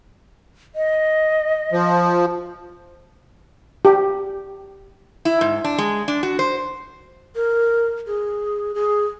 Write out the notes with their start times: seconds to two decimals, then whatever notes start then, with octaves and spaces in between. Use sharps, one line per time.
0.76 D#5
1.72 F3
3.85 G4
5.25 E4
5.41 G#2
5.64 D4
5.78 G#3
6.08 D4
6.23 F#4
6.39 C5
7.35 A#4
8.07 G#4
8.75 G#4